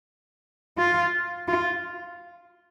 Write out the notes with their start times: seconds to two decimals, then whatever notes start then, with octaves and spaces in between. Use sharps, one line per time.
0.78 F4
1.48 F4